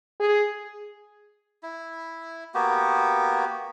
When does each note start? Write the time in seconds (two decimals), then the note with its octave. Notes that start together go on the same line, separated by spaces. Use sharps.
0.20 G#4
1.63 E4
2.54 A#3 B3 F#4 G4